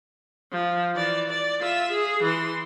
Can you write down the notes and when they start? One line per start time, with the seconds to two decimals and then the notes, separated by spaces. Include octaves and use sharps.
0.52 F3
0.95 E3 D5
1.29 D5
1.60 F4 E5
1.91 G#4
2.23 E3 C6